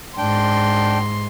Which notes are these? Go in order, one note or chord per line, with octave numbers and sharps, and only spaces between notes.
G#2 D4 G5 C6